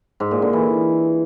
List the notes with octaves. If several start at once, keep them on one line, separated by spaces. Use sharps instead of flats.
G#2
A#2
D3
E3